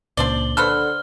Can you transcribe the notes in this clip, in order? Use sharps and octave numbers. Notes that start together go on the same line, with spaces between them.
C#2 A#2 C#3 D4 C5 D5 G7
D3 A4 B4 C5 F6 F#6